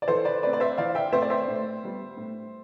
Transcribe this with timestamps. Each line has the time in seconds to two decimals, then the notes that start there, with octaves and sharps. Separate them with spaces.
0.02 D5
0.08 E3 A4 C5
0.25 B4 D5
0.42 A3 B4 D5
0.46 C4
0.53 D5
0.60 C5 E5
0.78 E3 D5 F5
0.95 E5 G5
1.12 A3 C4 C5 E5
1.22 D5
1.30 C5 E5
1.47 A2
1.83 G3 B3
2.17 A2